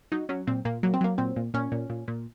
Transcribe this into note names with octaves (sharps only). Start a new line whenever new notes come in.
F#3 D#4
F#3 C#4
A#2 C4
A#2 A#3
F#3 A#3
C4
F#3 A#3
A#2 C4
A#2
A#2 C#4
A#2
A#2
A#2